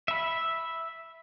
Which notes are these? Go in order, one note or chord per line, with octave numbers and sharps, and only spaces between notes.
E5 B5